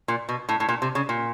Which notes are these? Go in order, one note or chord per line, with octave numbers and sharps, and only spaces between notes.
A#2
B2
A2
A2
A#2
C3
C#3
A#2